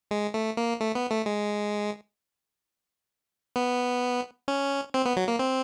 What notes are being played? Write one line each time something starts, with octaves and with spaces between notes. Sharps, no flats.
G#3
A3
A#3
A3
B3
A3
G#3
B3
C#4
C4
B3
F#3
A#3
C4